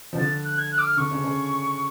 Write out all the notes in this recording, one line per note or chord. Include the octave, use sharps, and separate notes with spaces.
F3
D3 A6
F#6
G#6
F#6
D6
F6
D3 C#6
C#3
C#3